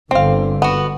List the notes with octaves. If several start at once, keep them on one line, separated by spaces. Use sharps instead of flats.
G1 D3 C4 F5
B3 F#4